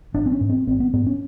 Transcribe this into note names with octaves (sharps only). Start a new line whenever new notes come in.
G#1 D4
C4
C#4
G#2
C4
G#1 C4
B3
G#2 B3
C#4